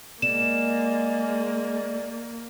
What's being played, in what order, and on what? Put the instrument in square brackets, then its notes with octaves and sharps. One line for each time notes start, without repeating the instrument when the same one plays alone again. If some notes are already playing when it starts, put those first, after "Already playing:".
[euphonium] G#3 [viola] A#3 [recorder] D5 [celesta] E7